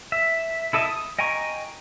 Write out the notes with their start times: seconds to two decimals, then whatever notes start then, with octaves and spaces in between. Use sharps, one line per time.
0.12 E5
0.73 E4 A4 D#5 E5
0.85 D#6
1.19 D#5 G5 G#5 A#5 C#6